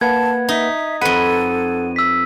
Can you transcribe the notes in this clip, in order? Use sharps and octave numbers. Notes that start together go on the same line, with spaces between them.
A#3 B4 F#5 A5 G#6
D#4 E5
F2 A4 B4 F#5 D#7
E6 B6